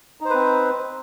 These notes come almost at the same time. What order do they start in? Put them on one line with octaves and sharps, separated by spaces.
D#4 C5 B4 C4